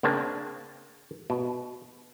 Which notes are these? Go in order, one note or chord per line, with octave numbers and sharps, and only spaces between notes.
C#3 A#3 C4 D4
B2